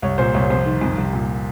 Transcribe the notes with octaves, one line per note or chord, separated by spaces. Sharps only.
C2 C#5
A#2 C5
C2 C#5
F2 C5
D#3
F2
C2
A#2